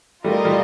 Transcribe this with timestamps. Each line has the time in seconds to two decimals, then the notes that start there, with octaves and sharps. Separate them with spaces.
0.24 G3 A3 F4 A#4 D#5
0.45 G3